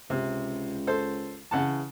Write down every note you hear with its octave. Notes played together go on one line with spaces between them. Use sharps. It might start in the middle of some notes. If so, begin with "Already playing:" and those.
C#2 C3
A4 C5
C#3 E3 F#5 A5